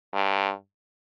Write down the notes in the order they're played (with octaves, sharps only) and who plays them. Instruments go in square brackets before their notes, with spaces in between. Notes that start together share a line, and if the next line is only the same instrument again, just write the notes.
[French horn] G2